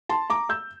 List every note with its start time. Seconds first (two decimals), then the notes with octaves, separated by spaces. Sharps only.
0.09 A5 C6
0.30 A#5 D6
0.49 E6 G6